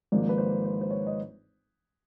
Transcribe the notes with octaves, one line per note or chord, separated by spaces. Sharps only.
G#1 G#2 F3 A#3 D5
B4
C5
C5
C5
C#5
D#5